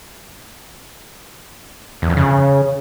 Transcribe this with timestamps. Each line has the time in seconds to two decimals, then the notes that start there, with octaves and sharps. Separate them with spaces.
2.02 E2
2.10 F2
2.17 C#3